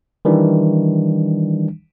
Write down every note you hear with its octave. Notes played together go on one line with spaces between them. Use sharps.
D#3 E3 G3 D4